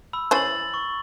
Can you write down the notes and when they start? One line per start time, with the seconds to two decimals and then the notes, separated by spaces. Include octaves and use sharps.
0.13 B5 E6
0.31 E3 C#4 C5 B5 A6 F#7
0.74 C#6